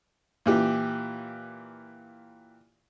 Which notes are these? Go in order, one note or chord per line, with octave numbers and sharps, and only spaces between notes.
A#2 E3 G4